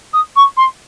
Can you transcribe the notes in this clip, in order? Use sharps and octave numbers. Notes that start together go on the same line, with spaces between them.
D#6
C#6
C6